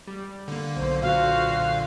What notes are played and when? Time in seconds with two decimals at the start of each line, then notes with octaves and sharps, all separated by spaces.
0.07 G3
0.48 D3 A#3
0.76 B1 F#3 C5
1.02 A#2 D3 F#4 C5 F5